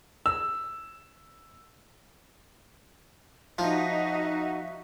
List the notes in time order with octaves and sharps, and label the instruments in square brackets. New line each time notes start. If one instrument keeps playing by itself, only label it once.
[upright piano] E6
[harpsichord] F3 F4 [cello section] D#4 [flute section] F#4 E5